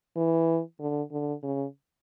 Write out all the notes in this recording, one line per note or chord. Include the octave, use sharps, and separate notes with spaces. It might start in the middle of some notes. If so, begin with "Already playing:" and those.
E3
D3
D3
C#3